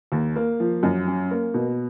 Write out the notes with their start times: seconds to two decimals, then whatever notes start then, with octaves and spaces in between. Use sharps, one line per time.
0.12 D#2
0.36 A#3
0.60 F3
0.83 F#2
1.07 C#4
1.31 A#3
1.54 B2